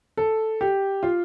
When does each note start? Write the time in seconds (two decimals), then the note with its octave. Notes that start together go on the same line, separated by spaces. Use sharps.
0.17 A4
0.61 G4
1.03 F4